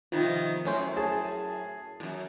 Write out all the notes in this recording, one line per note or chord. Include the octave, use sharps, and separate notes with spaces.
C3 D#3 F3 B3
F#2 A2 A3 C#4 C5
G#4 A5
F#2 A#2